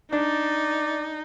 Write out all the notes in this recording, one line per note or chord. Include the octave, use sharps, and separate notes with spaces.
D4 D#4 D5